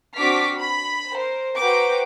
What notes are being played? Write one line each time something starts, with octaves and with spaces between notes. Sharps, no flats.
C4 D4 F#4 D6 F6 B6
B5
A#4 C5
F#4 B4 C5 G5 A#5 D6